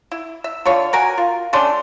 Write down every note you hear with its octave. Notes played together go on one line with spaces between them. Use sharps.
E4
E5
D3 F4 C#5
F#4 A#4 G#5
F4
A3 C#4 D4 C6